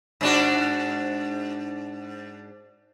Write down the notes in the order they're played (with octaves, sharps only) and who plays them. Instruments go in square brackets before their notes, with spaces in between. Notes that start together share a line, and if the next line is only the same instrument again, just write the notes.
[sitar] G#2 D4 F#4